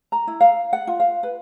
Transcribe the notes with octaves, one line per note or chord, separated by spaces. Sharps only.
A#5
E4
F5
F#5
F4
F5
B4